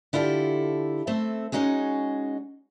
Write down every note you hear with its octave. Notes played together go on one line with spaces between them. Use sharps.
D3 E4 F4 G4 A4
A3 C4 A4 E5
G#3 C#4 D#4 F#4 G#4